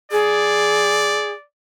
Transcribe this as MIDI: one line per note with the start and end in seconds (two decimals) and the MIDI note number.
0.12 1.32 68
0.12 1.45 74